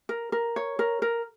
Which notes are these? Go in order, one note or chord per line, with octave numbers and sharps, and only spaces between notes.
A#4
A#4
C#5
A#4
A#4